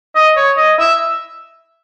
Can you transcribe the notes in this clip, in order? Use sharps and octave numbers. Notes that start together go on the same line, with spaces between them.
D#5
C#5
D#5
E5